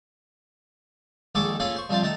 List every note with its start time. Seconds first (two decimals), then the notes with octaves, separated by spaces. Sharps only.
1.35 A#1 D#3 G#3 A4 C#6 D6
1.60 A#3 C#4 F4 G#4 A4
1.76 C5 C#6
1.89 G2 C3 F3 F4 C5 A5
2.03 D#3 A3 A5 A#5